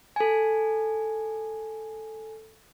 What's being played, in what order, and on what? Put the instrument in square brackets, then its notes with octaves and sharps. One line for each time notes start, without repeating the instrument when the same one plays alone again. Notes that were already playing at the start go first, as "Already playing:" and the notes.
[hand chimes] A4 G#5